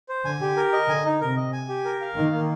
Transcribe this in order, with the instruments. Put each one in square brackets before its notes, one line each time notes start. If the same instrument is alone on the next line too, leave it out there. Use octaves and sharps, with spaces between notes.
[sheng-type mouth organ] C5
[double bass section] D3 [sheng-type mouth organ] G#5
[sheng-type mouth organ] G4
A#4
D#5
[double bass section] D3 [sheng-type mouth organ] G#5
[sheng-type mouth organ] D#4
[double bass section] C3 [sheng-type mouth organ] A#4
[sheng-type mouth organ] D#5
G#5
G4
A#4
F5
[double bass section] D#3 [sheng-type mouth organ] A#3
[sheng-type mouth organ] A#3